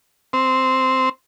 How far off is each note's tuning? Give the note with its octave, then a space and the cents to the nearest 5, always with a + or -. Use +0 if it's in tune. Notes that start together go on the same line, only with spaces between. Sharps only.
C4 -5